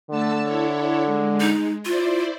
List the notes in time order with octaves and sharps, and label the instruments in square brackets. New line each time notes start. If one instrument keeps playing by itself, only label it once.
[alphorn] D3 [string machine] A3 A5 E6
[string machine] E4 A4 C#5
G#3
[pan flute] D#4
[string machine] E4 C5 D5 [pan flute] F4